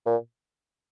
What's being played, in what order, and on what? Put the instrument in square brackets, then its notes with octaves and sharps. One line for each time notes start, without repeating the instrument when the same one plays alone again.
[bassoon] A#2